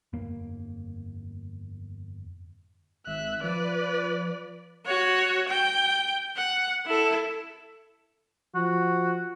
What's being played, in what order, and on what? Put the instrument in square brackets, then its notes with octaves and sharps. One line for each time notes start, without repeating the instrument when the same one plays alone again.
[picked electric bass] G1 F2 A#3
[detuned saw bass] G#1 [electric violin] E5 F#6
[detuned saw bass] F3 [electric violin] B4 D5
[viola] F#4 C#5
G5
F#5
E4 A4
[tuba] F3 [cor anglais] F#4